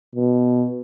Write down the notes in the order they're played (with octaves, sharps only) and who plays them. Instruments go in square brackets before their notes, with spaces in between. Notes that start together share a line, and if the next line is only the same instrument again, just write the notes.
[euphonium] B2